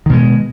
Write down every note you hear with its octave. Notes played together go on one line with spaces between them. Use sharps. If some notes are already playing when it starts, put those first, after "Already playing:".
B2 D#3 G#3